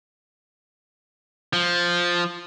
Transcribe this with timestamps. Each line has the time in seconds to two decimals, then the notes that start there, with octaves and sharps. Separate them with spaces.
1.53 F3